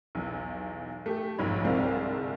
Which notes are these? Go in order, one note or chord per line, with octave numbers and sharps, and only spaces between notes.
B1 E2
A3 G4
B1 F2 G#2 C#5 B5
G1 C2 G#3 C4 D5 F5